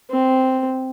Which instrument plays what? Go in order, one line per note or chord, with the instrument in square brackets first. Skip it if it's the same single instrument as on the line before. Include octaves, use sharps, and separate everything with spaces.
[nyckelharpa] C4